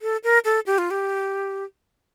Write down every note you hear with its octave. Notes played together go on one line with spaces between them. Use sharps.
A4
A#4
A4
G4
F4
G4